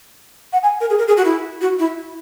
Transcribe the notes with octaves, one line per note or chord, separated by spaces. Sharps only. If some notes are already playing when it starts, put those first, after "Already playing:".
F#5
G#5
A#4
G#4
A#4
G#4
F#4
E4
F#4
E4